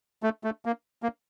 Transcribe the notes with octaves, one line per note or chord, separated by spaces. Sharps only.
A3
A3
A#3
A#3